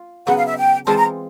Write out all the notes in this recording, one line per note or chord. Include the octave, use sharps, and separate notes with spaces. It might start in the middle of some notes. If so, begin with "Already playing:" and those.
Already playing: F4
C#3 F#3 B3 F#5
F5
E5
G5
E3 G#3 C4 F4 A5
A#5